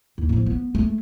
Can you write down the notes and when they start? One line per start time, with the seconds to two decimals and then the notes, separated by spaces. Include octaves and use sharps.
0.18 D#2
0.29 A2 F3
0.46 B3
0.75 G#3 A3